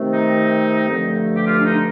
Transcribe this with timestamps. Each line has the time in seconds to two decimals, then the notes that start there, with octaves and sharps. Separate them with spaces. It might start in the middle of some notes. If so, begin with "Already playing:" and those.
Already playing: C3 D#3 A3 C4
0.12 D#4
0.88 G2 D3 F3 A3
1.36 G4
1.46 F4
1.61 D4
1.66 D#4